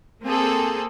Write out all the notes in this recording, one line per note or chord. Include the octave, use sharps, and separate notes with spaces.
A#3 C4 G#4 A4